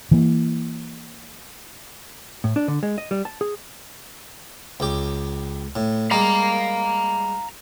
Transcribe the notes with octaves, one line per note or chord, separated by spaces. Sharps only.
E3 A#3
A2
D4
D3
G#3
D#5
G3
A5
G#4
C#2 G4
A2
G3 G#3 F5 A#5